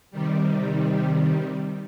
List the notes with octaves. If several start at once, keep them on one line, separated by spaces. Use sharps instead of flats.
C3 D#3 G3